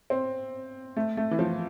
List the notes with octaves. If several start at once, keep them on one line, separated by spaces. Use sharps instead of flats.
C4
A3
A3
E3
F3